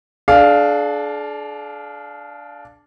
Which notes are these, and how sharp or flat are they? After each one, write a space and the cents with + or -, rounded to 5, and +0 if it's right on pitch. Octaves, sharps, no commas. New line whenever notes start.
D4 +0 G#4 +45 F5 +0